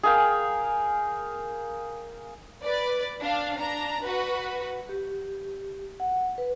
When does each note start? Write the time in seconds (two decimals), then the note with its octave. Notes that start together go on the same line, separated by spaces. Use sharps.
0.03 G#4 A#4 F5 G5
2.63 B4 D5
3.22 D4 F5
3.59 D4 A#5
4.02 F#4 B4
4.89 G4
6.00 F#5
6.38 B4